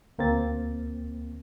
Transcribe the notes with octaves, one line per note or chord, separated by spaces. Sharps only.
D2 A#3 C4 A6